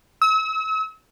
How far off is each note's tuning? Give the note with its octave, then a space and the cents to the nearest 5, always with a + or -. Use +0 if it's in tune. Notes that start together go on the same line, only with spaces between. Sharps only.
E6 -40